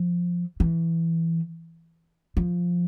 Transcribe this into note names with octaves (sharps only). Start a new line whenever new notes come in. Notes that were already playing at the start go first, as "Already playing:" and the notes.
Already playing: F3
E3
F3